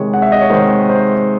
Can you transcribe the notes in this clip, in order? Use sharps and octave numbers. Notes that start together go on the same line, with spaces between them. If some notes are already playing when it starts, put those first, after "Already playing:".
Already playing: C3 D#3 G#3 C#5
F#5
E5
D#5
C#5
C3 D#3 G#3 C5
C5